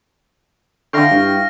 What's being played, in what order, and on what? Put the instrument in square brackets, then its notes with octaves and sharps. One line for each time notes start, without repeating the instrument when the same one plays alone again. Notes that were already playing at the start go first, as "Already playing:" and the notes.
[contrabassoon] D3 [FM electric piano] E4 F5 G5 [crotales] C#6 F6 A#6
[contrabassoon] G2